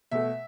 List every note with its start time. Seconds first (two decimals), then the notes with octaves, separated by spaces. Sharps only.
0.11 B2 A3 E5